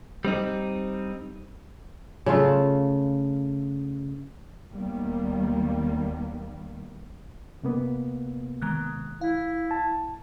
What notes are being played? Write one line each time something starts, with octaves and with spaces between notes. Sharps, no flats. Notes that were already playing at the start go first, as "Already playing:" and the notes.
G3 C4 D#4
C#3 A3 F4
D#2 D#3 G3 A#3 B3
C3 A#3 B3
D#3 G#3 F#6
E4 F5
A5